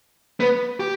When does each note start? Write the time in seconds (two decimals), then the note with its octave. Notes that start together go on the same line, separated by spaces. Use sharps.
0.40 B3
0.80 G4